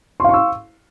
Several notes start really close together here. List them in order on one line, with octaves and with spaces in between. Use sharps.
C6 F5 C#6 E6